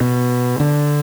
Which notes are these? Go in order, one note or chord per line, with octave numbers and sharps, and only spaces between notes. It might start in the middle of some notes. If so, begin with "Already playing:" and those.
B2
D3